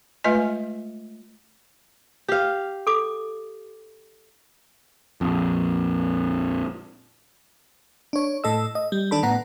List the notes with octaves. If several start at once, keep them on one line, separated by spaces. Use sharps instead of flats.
G#3 A3 F4 B4 D#5 G#5
G4 F5
A4 D6
A#1 F2
D4 C#5
A2 A4 D#5 E6
D#5
G3
D#3 D4 A4 B5
A2 B3 F#5 A#5